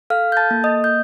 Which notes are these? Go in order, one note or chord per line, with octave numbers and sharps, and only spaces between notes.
A4 F5 F6
G6
A5 A6
A#3
D#5 D#6
G6